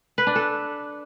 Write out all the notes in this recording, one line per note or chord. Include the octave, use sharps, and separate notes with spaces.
B4
D4
A4